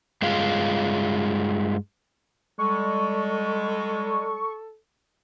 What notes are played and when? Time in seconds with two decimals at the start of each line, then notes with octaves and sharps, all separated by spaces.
0.22 G2 G#3 F4
2.59 G3 G#3 A4 C#6